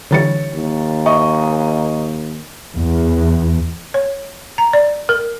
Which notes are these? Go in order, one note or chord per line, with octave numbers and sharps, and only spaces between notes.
D3 E3 G3 C#5 A6 C#7
D#2
D#5 C#6
E2
C#5
A#5
D5
A#4